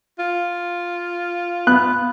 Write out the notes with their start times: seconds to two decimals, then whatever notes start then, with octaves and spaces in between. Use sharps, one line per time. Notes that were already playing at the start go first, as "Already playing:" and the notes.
0.19 F4
1.67 B3 F#6